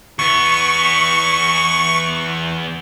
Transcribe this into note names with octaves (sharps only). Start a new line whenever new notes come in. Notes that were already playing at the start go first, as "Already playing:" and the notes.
E2 B3 C#6